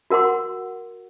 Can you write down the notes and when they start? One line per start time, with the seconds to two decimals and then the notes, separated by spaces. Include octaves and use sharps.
0.10 F#4 A#4 F#5 C6 D6